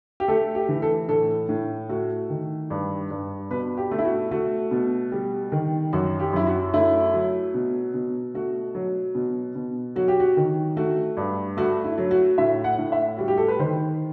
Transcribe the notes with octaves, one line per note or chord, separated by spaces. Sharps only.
G4
A3 A4
G4
E3
A4
A2 A4
A2
A3 F#4
D#3
G2
G2
B2 B4
G4
A3
E4
F#4
A3 F#4
B2
G3
D#3
F#2 F#4
G4
F#2 E4
F#4
A3 E4
F#3
B2
B2
A3 F#4
F#3
B2
B2
F#3 F#4
G4
F#4
D#3
A3 F#4
G2
A3 F#4
E4
F#3
F#4
A2 E5
F#5
A2
E5
G3 F#4
G4
A4
B4
D#3 C5